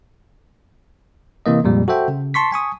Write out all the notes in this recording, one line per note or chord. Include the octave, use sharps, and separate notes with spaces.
C3 E3 A#3 D#5
F2 A#2 G3 G#3
F#4 A4 C5 E5 G5
C#3
A5 C6 C#6 B6
G#5 C#6 D#6